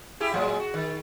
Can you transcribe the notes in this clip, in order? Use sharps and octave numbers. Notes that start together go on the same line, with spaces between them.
E4 G4 G#4
A2 F#3 G#3
F#4
D#3